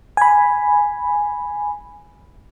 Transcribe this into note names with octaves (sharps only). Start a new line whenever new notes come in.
G#5 B5